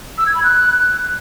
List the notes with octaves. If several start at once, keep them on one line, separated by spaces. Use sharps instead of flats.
E6
G#6
B5
F#6